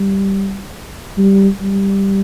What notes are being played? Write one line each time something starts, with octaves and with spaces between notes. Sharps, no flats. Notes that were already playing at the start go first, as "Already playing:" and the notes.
Already playing: G3
G3
G3